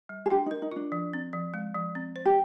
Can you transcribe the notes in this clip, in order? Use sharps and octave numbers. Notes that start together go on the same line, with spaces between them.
G3
G#4
D4 G4
D#4
A#4
D#4
D4 F4
F3
C4
F3
G#3
F3
C4
C5
G4